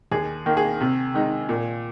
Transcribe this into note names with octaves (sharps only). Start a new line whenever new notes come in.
D#2 G#4
D#3 A#3
G#4
C3
D#3 G#3 D#4
A#2